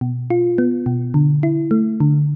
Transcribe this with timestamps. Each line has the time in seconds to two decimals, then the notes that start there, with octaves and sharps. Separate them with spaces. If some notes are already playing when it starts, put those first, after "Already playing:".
0.01 B2
0.30 F4
0.58 B3
0.86 B2
1.14 D3
1.43 E4
1.71 A3
2.00 D3